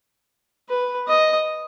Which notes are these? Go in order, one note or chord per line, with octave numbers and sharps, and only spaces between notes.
B4
D#5